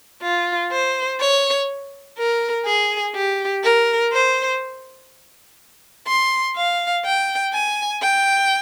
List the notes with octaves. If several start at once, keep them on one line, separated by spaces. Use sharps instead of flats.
F4
C5
C#5
A#4
G#4
G4
A#4
C5
C6
F5
G5
G#5
G5